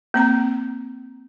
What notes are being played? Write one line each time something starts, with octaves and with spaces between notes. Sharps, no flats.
A#3 C4 A#5